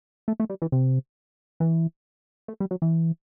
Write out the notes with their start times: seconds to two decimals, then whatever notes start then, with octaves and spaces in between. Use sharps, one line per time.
0.28 A3
0.40 A3
0.50 G3
0.62 E3
0.72 C3
1.60 E3
2.48 A3
2.60 G3
2.71 F#3
2.82 E3